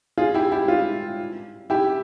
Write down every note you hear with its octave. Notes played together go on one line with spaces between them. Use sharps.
F4 G#4
E4 G4
E4 G4
F4
E4 G4